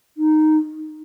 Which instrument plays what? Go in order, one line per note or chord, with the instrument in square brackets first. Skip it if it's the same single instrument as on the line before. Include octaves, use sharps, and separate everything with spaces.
[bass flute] D#4